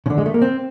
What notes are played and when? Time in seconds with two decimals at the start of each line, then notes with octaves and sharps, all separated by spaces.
0.06 C#3
0.10 D3
0.18 G#3
0.26 A3
0.34 A#3
0.42 C4